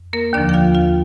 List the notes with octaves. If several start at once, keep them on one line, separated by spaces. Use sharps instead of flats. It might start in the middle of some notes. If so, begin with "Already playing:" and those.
Already playing: F2
A#3 A#4
D#2 D3 F3 D4 D5
G5
F4 F5
F4 F5